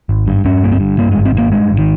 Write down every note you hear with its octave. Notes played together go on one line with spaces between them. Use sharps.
G#1
G2
G2 C#4
G1 A#3
C4
G2
G2 A#3
G#3
G#1
C4
G2
A#3
G2 G#3
G#1
D#3